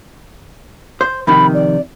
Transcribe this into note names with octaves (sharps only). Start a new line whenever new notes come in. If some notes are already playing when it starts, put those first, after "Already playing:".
C5
F2 C3 D#3 B5
D5